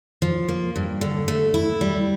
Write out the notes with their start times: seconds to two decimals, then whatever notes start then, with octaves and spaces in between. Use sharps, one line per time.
0.22 F3
0.49 A#3
0.76 G2
1.01 D3
1.28 A3
1.54 E4
1.81 G3